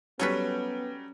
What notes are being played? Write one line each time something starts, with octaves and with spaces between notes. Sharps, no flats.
F#3 G3 B3 C#4 A4 B4